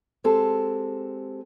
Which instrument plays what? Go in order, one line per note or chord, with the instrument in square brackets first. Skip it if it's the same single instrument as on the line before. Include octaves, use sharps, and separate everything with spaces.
[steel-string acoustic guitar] G#3 C4 G4 A4